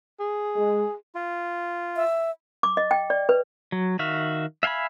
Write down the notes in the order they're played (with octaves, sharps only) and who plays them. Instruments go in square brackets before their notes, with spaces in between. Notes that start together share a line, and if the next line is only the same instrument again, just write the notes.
[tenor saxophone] G#4
[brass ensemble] G#3
[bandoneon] F4
[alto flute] E5
[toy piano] D6
D#5
G5
D5
B4
[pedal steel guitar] F#3
D#3 F#4 E5 F5
E5 F5 G5 G#5 B5